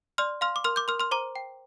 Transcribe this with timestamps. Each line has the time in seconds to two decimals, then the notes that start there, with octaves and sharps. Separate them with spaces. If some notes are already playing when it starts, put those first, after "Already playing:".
0.18 D5 C6 F6
0.41 F5 C6 F6
0.56 D6
0.64 A#4 C6 F6
0.76 D6 G6
0.88 A#4 C6 F6
1.00 C6 F6
1.11 C5 A#5 D6
1.36 G5